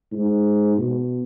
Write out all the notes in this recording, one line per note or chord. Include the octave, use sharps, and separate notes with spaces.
G#2
B2